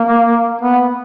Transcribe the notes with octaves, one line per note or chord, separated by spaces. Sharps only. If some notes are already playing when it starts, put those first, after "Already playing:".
Already playing: A#3
B3